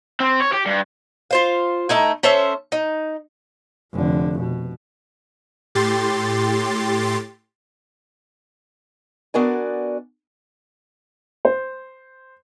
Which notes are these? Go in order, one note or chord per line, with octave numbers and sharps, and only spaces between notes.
C4
C#5
G4
G2
F4 C5 F5
A3 D#4 E4
C#4 A4 C5 E5
D#4
F1 D3
B2
A2 G4 C6 A6
B3 D4 F#4 A#4 D5 G#5
C5